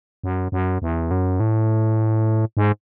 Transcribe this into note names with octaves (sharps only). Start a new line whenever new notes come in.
F#2
F#2
E2
F#2
A2
G#2